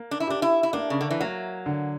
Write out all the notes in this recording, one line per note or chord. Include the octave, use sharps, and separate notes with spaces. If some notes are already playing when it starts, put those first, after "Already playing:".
Already playing: A#3
D4
E4
D4 G4
E4
E4
A#3 D4
C#3
D3
E3
F#3 A#3
D3